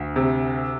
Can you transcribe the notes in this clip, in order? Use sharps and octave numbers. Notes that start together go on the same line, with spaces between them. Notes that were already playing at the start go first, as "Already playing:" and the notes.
Already playing: D2
C3